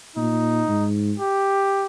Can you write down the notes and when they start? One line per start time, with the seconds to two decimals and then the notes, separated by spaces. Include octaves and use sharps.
0.16 A#2 D#4
0.68 G#2
1.20 G4